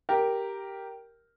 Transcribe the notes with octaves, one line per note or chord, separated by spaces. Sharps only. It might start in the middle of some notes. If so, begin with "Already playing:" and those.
G4 A#4